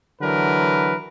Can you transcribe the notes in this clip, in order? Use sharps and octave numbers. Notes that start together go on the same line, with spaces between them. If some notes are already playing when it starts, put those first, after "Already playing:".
D3 E3 F#3 A#4 B4